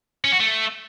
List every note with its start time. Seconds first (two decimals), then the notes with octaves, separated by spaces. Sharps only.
0.25 C#4
0.32 F#4
0.40 A3